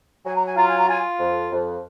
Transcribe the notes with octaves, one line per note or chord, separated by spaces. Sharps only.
F#3 G#5
A#5
G#5
F4 A#5
G#5
A#5
F4 G#5
F2
F2